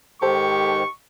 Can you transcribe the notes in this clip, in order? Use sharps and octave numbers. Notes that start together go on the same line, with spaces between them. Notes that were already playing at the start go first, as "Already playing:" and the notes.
G#2 D#3 G4 A4 C5 C#6